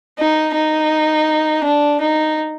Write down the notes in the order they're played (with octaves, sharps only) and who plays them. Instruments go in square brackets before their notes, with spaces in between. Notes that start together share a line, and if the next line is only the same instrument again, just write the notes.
[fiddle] D#4
D#4
D4
D#4